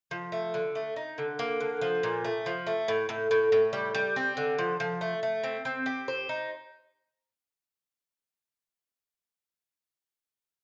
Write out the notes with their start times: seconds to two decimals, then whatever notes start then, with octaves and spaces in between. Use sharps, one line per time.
0.11 F3
0.32 A3
0.54 D3
0.75 A3
0.96 D#4
1.18 D3
1.39 A#3
1.60 D3
1.81 F3
2.03 A#2
2.25 A3
2.46 F3
2.67 A3
2.88 A2
3.09 A2
3.31 A2
3.52 A2
3.73 G3
3.95 G3
4.16 C4
4.37 D3
4.59 F3
4.80 F3
5.01 A3
5.23 A3
5.43 C4
5.65 C4
5.86 G4
6.08 C5
6.29 D#4